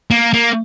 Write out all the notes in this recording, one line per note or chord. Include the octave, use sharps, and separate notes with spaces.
A#3
A#3